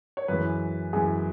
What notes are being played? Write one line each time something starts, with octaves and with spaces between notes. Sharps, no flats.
C#5
F#2 E3 G#3 B4
F#2 E3 G#3 G#4